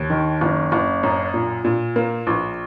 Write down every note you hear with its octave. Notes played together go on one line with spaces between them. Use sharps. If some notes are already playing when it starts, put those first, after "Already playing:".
Already playing: D#2
D#3
F#1
F#1
F#2
A#2
A#2
A#3
A#1